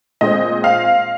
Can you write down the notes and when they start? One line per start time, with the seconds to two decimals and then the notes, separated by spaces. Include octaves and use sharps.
0.21 A#2 G#3 C4 D#5
0.64 F5